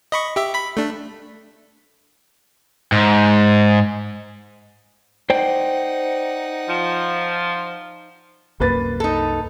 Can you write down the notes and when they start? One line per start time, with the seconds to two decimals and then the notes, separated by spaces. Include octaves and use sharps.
0.12 D#5 B5 C#6
0.36 G4 E5
0.54 B5 B6
0.77 A3 D4
2.92 G#2
5.30 D#4 C5 D5 F#5 G5
6.68 F3
8.60 C2 F#2 A#3 B4 A6
9.00 D#4 A4